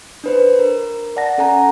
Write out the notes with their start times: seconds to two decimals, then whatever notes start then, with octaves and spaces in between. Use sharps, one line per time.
0.24 D4 B4 C5
0.59 A#4
1.16 D5 F#5 A5 A#6
1.38 C#4 A4 F#5 G#5 A#5